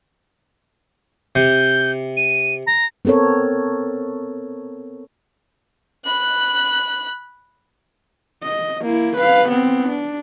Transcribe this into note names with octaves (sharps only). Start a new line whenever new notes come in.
C3 G6
D#7
A#5
B3 C4 A4 A#4 C#5
B5 F#6
D#5
A#3 E4
B4 F5
B3 C4
D4